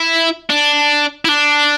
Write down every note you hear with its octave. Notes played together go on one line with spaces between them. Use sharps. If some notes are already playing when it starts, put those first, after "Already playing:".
Already playing: E4
D4
E4
D4